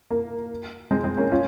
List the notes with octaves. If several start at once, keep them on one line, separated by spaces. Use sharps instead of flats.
A#3
G#3 C4
G#3 C4
A#3 C#4
C#4 F4